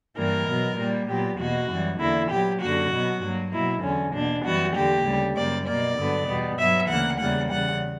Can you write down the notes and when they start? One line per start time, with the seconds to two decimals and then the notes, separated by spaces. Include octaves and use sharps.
0.16 G2 E3 G3 A#3 A#4
0.47 B2 F#3 B3
0.78 A#2 G3 A#3
1.08 A#2 F#3 B3 G4
1.39 E2 B2 A#3 F#4
1.69 F#2 E3 G3
2.00 E2 D3 A#3 E4
2.30 A#2 F#3 B3 G4
2.61 F#2 D3 A#3 F#4
2.91 B2 F#3 B3
3.22 G2 F#3 A#3
3.53 B2 F#3 A#3 E4
3.83 E2 D3 F#3 C#4
4.13 E2 B2 A#3 D4
4.44 F#2 E3 G3 B3 F#4
4.74 E2 D3 A#3 G4
5.05 D2 C#3 G3
5.36 F#2 C#3 G3 A#3 D5
5.66 B2 A#3 D5
5.97 G2 D3 F#3 B3
6.27 E2 B2 G3 B3
6.58 G2 F#3 B3 E5
6.88 D2 C#3 E3 A#3 F#5
7.19 E2 C#3 E3 G3 A#3 F#5
7.50 E2 C#3 G3 F#5